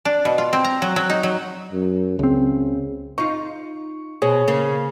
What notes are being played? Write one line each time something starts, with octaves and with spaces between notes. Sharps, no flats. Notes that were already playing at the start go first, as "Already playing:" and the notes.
D4
B2
F4
C4
A#5
F#3
F#3
D#4
F#3
F#2
C#2 C#3 C4
D#4 F4 C#6
B2 G#4 C5 C#5
C#3 A#3